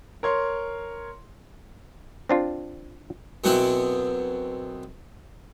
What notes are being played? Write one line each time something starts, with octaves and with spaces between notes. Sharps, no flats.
A#4 C#5 C6
C4 D4 F4
F#2 B2 F#3 B3 C4 E4